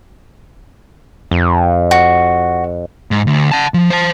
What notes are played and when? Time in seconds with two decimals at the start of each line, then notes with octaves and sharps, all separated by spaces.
1.31 F2
1.91 F#4
3.11 G#2
3.27 D2
3.51 F#5 A5
3.74 F3
3.90 C5 A5